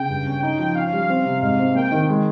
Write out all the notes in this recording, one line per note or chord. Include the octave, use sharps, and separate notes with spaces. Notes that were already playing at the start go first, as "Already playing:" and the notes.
Already playing: C#3 G5
G2
C#4
D#4 G5
F3
C#4 F5
G3
C4
C3
G#2
C4
A#3 G5
D#3
G#3